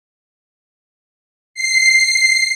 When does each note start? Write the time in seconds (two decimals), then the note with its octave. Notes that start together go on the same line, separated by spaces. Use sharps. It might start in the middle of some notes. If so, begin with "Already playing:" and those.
1.54 C7